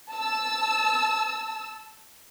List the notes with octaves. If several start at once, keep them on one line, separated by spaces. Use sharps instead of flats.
A5 E6